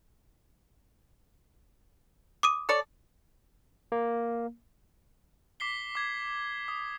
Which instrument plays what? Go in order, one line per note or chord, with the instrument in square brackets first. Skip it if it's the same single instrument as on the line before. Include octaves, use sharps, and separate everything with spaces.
[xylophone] D6 D#6 D#7
[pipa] A4 C#5 D5
[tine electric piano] A#3
[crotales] D6 B6 C7 G7
D6 G#6
D#6